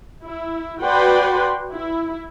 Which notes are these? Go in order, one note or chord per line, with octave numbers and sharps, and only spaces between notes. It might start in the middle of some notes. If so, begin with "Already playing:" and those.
E4
F#4 B4 D5 F#5 G5 C6
E4